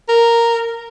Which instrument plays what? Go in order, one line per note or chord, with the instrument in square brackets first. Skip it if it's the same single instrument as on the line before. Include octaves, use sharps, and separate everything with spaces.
[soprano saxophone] A#4